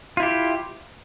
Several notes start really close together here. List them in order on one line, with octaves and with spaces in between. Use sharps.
F4 E4 G4